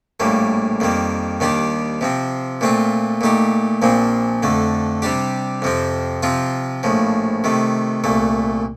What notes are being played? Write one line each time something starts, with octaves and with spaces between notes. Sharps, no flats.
A#1 A2 G3 A#3
F2 D#3 G3 A#3
D#2 D#3 G3 D4 G4
C3 F3 C4
A#2 A3 C4 F4
A#2 A3 D#4 G4
A#1 A#2 F3 C4
F2 D3 A3
C3 G3 D4 G4
F2 C3 F3 C4
C3 F3 C4 F4
A#1 A2 F3
C3 D#3 A3
C2 A#2 A3